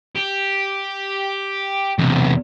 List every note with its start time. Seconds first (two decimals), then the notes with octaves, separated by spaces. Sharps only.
0.15 G4
1.99 B1 E2 C3